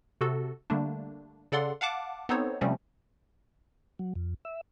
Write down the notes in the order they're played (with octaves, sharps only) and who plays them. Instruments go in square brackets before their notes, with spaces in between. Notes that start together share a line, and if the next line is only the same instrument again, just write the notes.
[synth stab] C3 F#4 A4
D3 G3 A3 A#3 D4
C#3 A4 D5 F#5 C6
F5 F#5 A5 D6
B3 C4 D#4 A4 C5 C#5
C3 F3 G3 A3 C4 C#4
[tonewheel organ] F#3
F2
E5